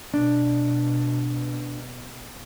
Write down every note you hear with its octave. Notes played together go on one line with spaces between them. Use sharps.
B2 D4